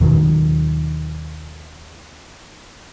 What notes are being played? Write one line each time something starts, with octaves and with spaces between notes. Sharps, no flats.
D#2 B2 D#3 F#3